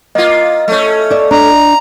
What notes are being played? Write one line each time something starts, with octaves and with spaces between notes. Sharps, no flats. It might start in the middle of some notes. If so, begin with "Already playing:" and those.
A#3 F4 D#5
A3 C#4
D5 E5
D4 A#5